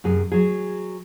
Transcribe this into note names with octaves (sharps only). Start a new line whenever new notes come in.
F#2 C3 G#4
F#3 G#4